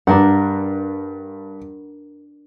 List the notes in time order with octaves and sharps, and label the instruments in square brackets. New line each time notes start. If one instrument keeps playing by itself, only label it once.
[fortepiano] G2 [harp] D4 A#4 F#5